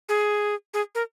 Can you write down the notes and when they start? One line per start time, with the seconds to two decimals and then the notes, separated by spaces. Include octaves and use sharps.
0.09 G#4
0.74 G#4
0.95 A#4